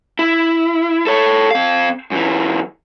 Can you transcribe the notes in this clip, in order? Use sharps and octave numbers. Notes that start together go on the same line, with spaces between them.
E4
A4 C#5
C4 F5
F#2 E3